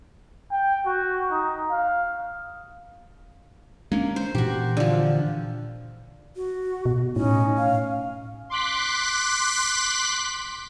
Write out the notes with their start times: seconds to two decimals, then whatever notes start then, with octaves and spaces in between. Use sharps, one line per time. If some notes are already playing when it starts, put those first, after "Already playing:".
0.51 G5
0.86 F#4
1.32 D#4
1.70 F5
3.92 G#3 A#3 C#4 D4
4.16 C5
4.35 A#2 E3 F#4 G4
4.77 D3 F3
6.35 F#4
6.86 B2
7.16 A2 C#4 D#4
7.58 F5
8.50 C6 D6 F#6 B6